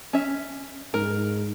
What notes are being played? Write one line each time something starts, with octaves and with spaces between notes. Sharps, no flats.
C#4 E5
G#2 A#4